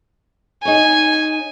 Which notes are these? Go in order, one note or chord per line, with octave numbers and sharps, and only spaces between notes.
D#4 G#4 C#5 G#5